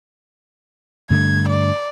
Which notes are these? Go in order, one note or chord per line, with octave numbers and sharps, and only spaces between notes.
G2 D3 A3 G#6
D5